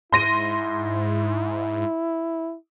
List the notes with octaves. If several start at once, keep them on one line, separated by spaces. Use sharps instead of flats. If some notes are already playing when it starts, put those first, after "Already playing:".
G#2 E4 C6 A#6 D#7